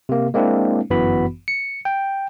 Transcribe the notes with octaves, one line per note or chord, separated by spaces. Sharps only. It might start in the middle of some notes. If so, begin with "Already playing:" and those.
C3 A#3
G#3 A#3 C4 D4 E4
G1 F#2 E3 B3 F#4 B5
C#7
G5